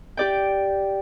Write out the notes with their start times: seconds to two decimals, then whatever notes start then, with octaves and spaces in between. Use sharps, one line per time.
0.17 G4 D5 G5